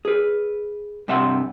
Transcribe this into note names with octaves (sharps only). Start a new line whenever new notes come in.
G#4 B4
G2 C3 E5 F#5 C6